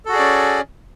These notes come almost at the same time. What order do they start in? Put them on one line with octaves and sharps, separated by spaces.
A4 F#4 G#4 D5 C#4